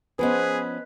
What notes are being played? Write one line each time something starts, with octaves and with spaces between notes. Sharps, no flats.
F3 B3 C#4 G#4 B4 C5 D#5